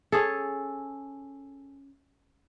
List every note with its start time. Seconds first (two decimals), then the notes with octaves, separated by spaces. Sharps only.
0.12 C#4 G#4 A4